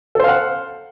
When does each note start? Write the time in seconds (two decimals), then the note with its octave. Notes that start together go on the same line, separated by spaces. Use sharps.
0.15 A4
0.20 C5
0.24 F5
0.28 F#5